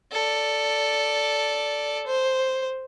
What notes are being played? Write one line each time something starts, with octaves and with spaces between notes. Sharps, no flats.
A4 D5
C5